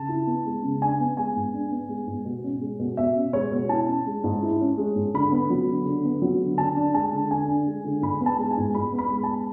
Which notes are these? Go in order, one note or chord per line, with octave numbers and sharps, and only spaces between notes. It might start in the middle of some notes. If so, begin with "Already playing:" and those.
Already playing: C#3 A5
E4
B3
G#3
C#3
D4 G#5
B3
G#3 G#5
G#2
D4
B3
G#3
G#2
B2
C#4
G#3
B2
B2 E5
C#4
G#3 C#5
B2
E4 A5
C#4
G#3
G#2
E4
C#4
G#3
G#2
D3 B5
B3
F#3
D3
D3
B3
F#3
D3
D3 A5
D4
G#3 A5
D3
D3 G#5
D4
G#3
D3
G#2 B5
B3
A5
G#3
G#5
G#2
G#2 B5
B3
B5
G#3
A5